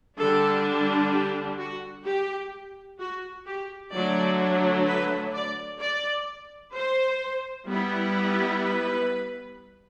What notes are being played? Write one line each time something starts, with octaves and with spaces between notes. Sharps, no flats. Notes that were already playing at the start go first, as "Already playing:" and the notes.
D3 G3 D4 A4
G4
F#4
G4
F#4
G4
D3 F#3 A3 D4 D5
B4
D5
D5
C5
G3 B3 E4
B4